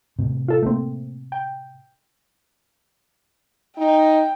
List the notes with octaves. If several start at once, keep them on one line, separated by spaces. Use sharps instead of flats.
A2 C3
F4 A4
A3 A#3 C4
G5
D#4 G5